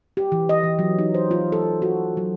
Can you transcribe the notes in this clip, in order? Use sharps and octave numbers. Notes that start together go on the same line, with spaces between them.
G4
E3
D#5
E3
F#3
D#4
C5
F4
A4
F#4
F#3